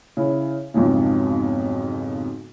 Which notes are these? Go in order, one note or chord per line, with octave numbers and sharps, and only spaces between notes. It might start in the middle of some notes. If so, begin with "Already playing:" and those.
C#3 E4
B1 F2 G#2 C#3